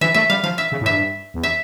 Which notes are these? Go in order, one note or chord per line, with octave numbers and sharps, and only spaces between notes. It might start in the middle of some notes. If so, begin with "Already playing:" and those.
E3 E5
A3 E5
G3 F5
F3 F5
E5
C#3
A2
G2 E5
E2
E5